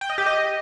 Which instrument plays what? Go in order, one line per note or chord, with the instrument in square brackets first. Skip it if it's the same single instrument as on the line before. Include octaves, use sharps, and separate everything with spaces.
[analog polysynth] G5
D#5
G4
D#5